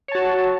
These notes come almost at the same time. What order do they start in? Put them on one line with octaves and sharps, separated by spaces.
C#5 A5 F#4